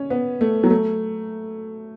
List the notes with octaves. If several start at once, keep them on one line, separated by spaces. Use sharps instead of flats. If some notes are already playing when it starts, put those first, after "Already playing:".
Already playing: C#4
B3
A3
F#3
A3